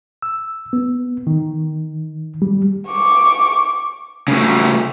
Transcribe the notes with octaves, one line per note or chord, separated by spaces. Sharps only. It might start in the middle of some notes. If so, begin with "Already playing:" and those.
E6
B3
D#3
G3
C#6 D6
C#3 A3